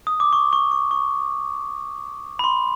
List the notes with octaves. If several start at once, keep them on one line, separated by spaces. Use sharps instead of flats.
D#6
D6
C#6
C#6
C#6
C#6
B5
C6